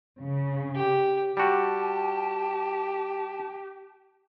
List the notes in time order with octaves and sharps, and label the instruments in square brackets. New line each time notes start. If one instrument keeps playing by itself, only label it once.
[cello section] C#3
[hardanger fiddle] G4
[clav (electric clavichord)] G3 F#4 [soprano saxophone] G4 [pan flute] A5